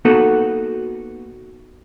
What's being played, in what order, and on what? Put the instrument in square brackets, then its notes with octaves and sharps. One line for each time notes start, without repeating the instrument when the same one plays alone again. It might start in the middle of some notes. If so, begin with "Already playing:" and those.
[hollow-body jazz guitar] A#3 B3 D#4 F#4 A4 B4